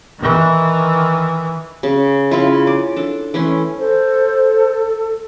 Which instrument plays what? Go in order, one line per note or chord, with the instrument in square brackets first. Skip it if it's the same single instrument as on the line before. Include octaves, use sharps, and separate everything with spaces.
[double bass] D#3 E3
[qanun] C#3
C#3 E4 F4
D5
D4 A4
E3 A3 C#4 C6
[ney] A4 [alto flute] C5